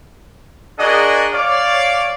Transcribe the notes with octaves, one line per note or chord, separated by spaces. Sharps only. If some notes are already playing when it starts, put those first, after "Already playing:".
D4 F#4 G#4 A#4 D5 D#5
C#5 D5 F5